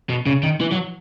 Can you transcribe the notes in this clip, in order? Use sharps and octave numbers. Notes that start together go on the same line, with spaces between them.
B2
C#3
D#3
E3
F#3